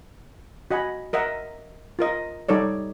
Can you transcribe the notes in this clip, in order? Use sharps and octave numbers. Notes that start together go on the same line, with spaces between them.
F#4 D#5 F#5 G#5 B5
A#4 D#5 E5 F#5
F4 A#4 D#5
G3 D#4 A4 C#5 D5